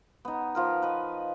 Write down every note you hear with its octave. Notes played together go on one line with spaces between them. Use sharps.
B3 D#4
F3 F4 A#4
B4 D#5